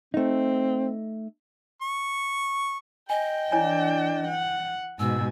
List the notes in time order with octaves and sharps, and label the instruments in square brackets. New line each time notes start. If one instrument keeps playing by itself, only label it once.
[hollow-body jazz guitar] A3 D#4 [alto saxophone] C4
[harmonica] C#6
[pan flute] D#5 [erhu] G5 [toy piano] G#5
[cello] E3 D4 [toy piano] E4 C#5 G#5
[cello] F#5
[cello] G#2 B2 [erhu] G#5 [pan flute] E6